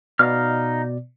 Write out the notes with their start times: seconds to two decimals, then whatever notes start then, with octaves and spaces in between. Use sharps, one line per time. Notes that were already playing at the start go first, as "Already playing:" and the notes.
0.19 B2 B3 D#4 D5 F5 F6